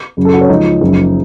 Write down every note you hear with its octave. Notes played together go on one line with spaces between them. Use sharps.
F#1 F#2 C#3 F#3
A4
F#4
C#4
C#2 C#3 F3 D#4
F#1 F#2 C#3 F3